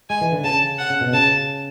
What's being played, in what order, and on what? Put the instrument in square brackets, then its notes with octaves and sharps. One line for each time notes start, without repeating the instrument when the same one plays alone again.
[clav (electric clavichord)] G#3 [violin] G#5
[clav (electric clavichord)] E3
D3
[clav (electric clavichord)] C#3 [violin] A5
[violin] F#5
[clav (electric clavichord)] C#3
B2
[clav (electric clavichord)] C#3 [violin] A5